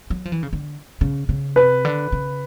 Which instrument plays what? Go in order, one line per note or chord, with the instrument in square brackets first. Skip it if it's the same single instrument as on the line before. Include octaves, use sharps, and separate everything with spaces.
[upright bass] F#3
F3
E3
C#3
D3
C#3
C#3
[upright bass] C3 [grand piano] B4
[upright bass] D3
C#3